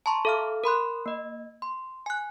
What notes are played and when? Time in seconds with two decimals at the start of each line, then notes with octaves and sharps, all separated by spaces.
0.06 A5 A#5 C6 C#6
0.25 A4 E5 F5 D6 F6
0.64 A#4 B5 C6 F#6
1.06 A#3 D#5
1.62 C6
2.06 G#5 F#6